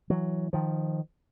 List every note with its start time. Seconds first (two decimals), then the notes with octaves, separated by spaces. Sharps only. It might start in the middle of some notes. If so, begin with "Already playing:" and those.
0.10 E3 F#3
0.53 D#3 F3